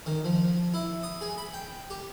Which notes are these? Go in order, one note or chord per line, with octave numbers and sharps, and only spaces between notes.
D#3
F3
E4
D#6
G#4
B5
G5
G4